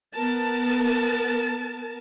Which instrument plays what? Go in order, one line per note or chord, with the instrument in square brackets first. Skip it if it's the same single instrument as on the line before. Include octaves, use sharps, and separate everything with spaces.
[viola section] B3 A#4 A5